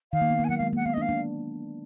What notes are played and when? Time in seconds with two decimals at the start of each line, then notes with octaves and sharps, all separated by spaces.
0.12 D#3 F5
0.21 A#3
0.30 B3
0.39 A#3
0.44 G#5
0.49 F#3 F#5
0.57 G#3 F5
0.73 A#3
0.76 F#5
0.85 B3 F5
0.93 D#5
0.97 D4
1.01 F5
1.09 D4